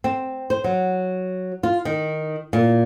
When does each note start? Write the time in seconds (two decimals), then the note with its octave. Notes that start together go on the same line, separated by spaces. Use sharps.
0.04 C4
0.50 C5
0.64 F#3
1.63 F4
1.85 D#3
2.53 A#2